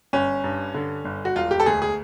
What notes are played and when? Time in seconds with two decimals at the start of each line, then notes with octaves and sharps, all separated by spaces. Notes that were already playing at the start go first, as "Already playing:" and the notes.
0.13 G1 C#4
0.44 G2
0.74 D3
1.05 G1
1.25 F#4
1.35 E1 F4
1.51 G4
1.60 A4
1.66 D2 G#4
1.82 G#4